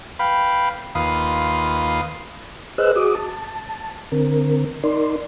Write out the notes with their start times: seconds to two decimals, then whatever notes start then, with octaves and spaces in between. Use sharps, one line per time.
0.19 B4 F5 G5 B5
0.95 D#2 F4 B4 C6 D#6
2.78 G#4 B4 C5 D#5 E6 F#6
2.96 F#4 G#4 D6 D#6
3.15 A5
4.12 D3 C4 A#4
4.84 D#4 A#4 D5 C6